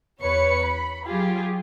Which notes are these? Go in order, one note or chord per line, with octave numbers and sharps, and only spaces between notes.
E2 B4 C#5 C#7
B5
F#3 F4 G4 G#4